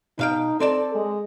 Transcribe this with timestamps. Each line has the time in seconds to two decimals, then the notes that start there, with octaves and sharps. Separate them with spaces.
0.19 B2 D#4 F5 G5
0.60 C4 A4 D5 A5
0.95 G#3